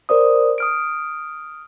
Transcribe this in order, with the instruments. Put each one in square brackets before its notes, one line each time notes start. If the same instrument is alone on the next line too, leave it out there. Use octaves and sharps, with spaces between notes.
[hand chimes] A#4 C5 D5 D#6
D#6 F6 D7